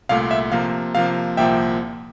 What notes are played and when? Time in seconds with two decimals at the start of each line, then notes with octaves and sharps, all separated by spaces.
0.09 C2 A#2 A3 F5
0.31 E5
0.52 C3 F3 A#3 F5
0.94 C3 F3 A#3 F5
1.37 C2 A#2 F3 A#3 E5 G5